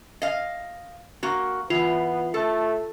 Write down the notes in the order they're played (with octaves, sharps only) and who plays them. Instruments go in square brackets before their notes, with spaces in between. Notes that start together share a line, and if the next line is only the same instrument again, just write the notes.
[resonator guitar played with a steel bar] D#5 F5
A#3 F#4
[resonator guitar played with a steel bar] E3 [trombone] B3 [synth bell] F4
[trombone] A3 [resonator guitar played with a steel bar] A4